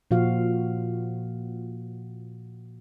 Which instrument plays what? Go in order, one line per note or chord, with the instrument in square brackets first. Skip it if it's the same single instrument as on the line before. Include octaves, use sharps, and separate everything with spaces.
[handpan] A#2 F3 F#4 F5